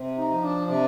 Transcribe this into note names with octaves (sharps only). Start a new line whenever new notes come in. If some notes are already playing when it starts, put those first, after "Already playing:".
Already playing: C3
D#4
F3
D4
C3 D4